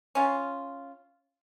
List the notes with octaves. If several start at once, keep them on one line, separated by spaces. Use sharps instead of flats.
C#4 F4